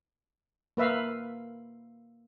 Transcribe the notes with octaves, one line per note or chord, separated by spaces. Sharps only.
A#3 B4 E5 F5